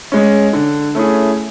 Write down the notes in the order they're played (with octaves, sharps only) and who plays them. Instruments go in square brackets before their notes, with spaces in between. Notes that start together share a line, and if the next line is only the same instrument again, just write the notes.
[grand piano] G#3 C#4
D3
A3 C#4 E4 G#4